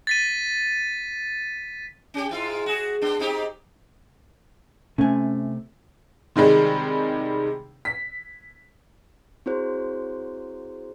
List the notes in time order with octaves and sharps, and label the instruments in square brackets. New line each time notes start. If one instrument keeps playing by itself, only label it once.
[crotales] A6 B6 D#7
[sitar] C#4 G4
G#2 E4 F4
F#4 G#4
B3 D4
C4 D#4 G4
[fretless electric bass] C3 A3 [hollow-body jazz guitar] C#4 G#5
[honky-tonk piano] C3 D#3 G3 G#3
B6
[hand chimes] C4 E4 F#4 G#4 C5 C#5